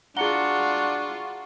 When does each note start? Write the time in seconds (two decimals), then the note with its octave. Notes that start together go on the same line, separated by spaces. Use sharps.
0.17 D4 F4 F#4 G#4 F#5 A#5 C#7 G7